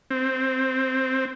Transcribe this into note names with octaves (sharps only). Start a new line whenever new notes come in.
C4